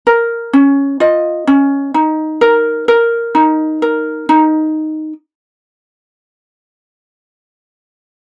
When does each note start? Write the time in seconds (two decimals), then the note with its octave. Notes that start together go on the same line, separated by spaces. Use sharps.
0.07 A#4
0.53 C#4
1.00 F4 D#5
1.47 C#4
1.94 D#4
2.41 A#4
2.88 A#4
3.35 D#4
3.82 A#4
4.29 D#4